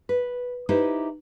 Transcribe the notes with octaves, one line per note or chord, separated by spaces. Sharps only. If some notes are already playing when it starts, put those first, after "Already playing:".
B4
D#4 E4 G4 B4 C5 D#5